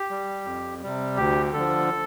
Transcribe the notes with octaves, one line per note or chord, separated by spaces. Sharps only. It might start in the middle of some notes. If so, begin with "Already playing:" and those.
Already playing: G4
G3
F2
C3 G3
D2 G4
D3 F3 A4